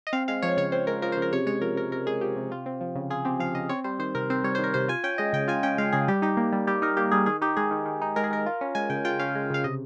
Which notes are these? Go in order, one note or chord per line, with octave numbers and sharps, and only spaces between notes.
D#5
C4 F5
G#3 F5
F3 C#5
C#3 C#5
C4 C5
G#3 A#4
F3 A#4
C5
C#3
A#4
C3 C#5
G#3 C#5
F3 A#4
C3 A#4
C3 A#4
G#3 G#4
F3 G4
C3
F4
C4
F3
C#3
F4 G#4
C4 G4
F3 F5
C#3 D#5
C4 C#5
G3 C5
D#3 C5
C3 A#4
C4 C5
G3 C#5
D#3 C5
A#4
C3 C5
F4 G#5
C#4 G5
G#3 D#5
C#3 G5
F4 G#5
C#4 G5
G#3 F5
C#3 G#4
G3 G4
D#4 G4
A#3
G3
G3 G4
D#4 A#4
A#3 G4
G3 G#4
D#3 G#4
D#4 G4
G#3 G#4
D#3
D#3
D#4
G#3 A#4
G#4
D#3 A#4
F4
C#4
G#3 G#5
C#3 G5
F4 G5
C#4 F5
G#3
C#3 F5
C3 D#5